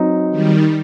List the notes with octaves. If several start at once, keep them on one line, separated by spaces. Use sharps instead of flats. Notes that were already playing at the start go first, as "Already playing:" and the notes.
Already playing: F#3 C4 D#4
D#3 G3